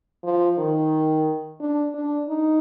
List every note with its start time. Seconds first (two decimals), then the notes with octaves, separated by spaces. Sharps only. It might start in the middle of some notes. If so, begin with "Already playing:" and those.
0.24 F3
0.58 D#3
1.61 D4
1.95 D4
2.29 D#4